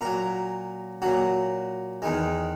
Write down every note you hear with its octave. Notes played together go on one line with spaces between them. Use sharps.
A#2 F#3 A#4
A#2 F#3 F#4
E2 D#3 G#3